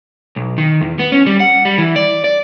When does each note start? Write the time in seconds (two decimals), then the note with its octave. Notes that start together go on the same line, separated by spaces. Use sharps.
0.36 B1
0.58 D#3
0.81 E2
0.99 B3
1.12 C#4
1.26 G3
1.40 F#5
1.65 G3
1.78 E3
1.96 D5
2.24 D5